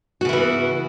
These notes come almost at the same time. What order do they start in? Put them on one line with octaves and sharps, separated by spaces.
F#4 C#3 E4 E3 B3